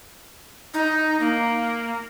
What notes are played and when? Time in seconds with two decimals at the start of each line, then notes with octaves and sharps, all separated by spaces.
0.74 D#4
1.20 A#3